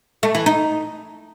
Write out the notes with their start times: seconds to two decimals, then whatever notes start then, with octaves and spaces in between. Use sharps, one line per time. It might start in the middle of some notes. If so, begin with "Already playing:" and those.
0.23 A3
0.35 E3
0.46 D#4